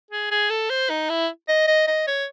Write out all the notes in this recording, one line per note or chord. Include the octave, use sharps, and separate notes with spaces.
G#4
G#4
A4
C5
D#4
E4
D#5
D#5
D#5
C#5